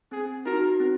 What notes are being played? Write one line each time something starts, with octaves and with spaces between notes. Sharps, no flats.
C4 G#4
D#4 F#4 A#4
C4